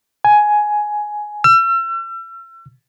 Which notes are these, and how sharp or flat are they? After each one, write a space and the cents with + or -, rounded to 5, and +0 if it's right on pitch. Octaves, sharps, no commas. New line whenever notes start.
G#5 +10
E6 +40